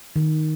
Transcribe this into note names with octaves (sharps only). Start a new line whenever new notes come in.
D#3